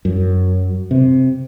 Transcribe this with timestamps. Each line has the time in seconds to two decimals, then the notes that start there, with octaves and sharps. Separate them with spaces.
0.05 F#2
0.91 C3